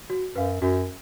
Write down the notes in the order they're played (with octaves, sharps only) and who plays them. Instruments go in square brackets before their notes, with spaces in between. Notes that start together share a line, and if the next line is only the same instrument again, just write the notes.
[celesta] F#4
[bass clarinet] F#2 [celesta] B4 F5
[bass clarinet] F#2 [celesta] F#4